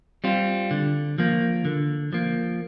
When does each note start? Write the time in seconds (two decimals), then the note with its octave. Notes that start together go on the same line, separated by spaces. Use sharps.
0.24 G3 C4 F4
0.71 D3
1.18 F3 A#3
1.65 D3
2.13 F3 A#3